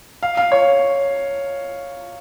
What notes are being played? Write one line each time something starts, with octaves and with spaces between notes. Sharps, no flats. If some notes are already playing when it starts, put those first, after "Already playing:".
F5
F5
C#5